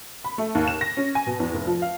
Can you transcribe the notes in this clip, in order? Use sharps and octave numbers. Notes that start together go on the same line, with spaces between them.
B5
A3
D#2
E7
A#6
C#4
G#5
B2
E2
F1
F3
F5